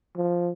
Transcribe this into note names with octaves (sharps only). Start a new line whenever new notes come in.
F3